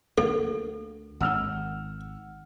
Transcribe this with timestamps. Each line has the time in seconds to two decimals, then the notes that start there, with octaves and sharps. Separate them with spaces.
0.18 D2 A#3 A4
1.21 G#1 D#3 F#5 E6 F6